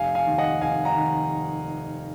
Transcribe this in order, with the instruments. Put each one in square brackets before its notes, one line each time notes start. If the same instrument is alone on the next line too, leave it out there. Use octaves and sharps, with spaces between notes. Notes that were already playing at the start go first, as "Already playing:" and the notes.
Already playing: [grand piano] F1 F5 G#5
F5 G#5
D#2 D#3
D#5 F#5
F1 F5 G#5
F#5 A#5
D#3